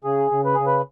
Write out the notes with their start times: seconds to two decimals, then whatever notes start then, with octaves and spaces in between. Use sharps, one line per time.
0.04 C#3 G#4
0.31 C#3
0.45 B4
0.55 C#3 G#4
0.66 B4